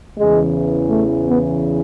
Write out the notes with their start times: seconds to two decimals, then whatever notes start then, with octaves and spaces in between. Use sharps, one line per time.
0.18 E2 C#3 E3 G#3
0.90 A3
1.27 B3